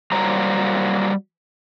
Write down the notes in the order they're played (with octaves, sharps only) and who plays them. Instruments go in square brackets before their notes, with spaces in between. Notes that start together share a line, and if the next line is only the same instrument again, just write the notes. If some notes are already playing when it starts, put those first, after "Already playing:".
[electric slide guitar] F#3 G3 A#3 C5 A#5